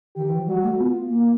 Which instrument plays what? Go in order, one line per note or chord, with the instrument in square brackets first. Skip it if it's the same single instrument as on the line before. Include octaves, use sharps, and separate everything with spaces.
[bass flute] D#3 [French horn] G4
[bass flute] E3
F3
[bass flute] G3 [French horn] F#4
[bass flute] A3
[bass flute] B3 [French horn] F4
[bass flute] A#3